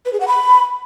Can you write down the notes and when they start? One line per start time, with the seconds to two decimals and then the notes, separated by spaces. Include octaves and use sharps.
0.06 B4
0.13 G#4
0.20 F#5
0.28 B5